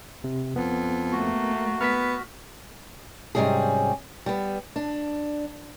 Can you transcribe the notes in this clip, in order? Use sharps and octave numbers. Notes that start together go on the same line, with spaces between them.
C3
F2 B3
A3 A#3 F#4
B3 F6 B6
G#2 C3 F#3 G3 C#4 G#4
G3 B3
D4